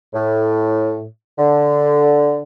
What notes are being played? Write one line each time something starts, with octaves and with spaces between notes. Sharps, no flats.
A2
D3